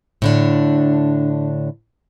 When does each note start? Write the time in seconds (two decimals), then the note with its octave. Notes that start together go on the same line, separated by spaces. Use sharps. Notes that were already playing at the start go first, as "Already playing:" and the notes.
0.22 A2 D3 D4